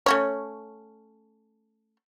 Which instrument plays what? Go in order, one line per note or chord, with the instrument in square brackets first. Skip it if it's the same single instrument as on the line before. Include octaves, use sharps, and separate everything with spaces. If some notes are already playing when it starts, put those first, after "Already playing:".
[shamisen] A3 C#4 C#5